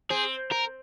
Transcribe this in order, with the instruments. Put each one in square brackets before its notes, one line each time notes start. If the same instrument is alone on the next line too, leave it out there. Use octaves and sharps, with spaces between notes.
[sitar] C4 [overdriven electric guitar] G#4
[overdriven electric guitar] A#4